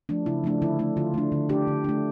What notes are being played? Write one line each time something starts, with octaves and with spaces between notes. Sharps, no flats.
F3 A3 D4
C#3 E4
F3 A3 D4
D3 E4
A3 D4
D3 F4
A3 D4
D3
A3 D4 G4
D3
A3 D4